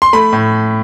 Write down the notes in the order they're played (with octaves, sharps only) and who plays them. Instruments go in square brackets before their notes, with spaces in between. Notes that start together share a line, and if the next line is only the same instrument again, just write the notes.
[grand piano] C6
A3 B5
A2